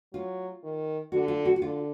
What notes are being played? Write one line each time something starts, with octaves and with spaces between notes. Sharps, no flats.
F#3 F4
D#3
D3 F#4
F4
F#4
F#4
D3 F4